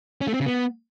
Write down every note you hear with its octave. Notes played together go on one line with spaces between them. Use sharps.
C#4
A3
C4
C#3
B3